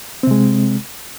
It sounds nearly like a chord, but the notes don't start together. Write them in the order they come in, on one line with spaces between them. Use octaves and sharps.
C4 C3 G#3